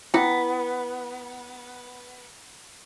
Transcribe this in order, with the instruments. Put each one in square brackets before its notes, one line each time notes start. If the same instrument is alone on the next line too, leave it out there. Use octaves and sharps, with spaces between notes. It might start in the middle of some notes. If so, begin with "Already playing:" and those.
[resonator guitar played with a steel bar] B3 [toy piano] E4 G5